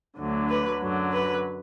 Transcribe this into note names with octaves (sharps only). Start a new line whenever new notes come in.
D2 D3 F#3
B4
F#2 D3 F#3
B4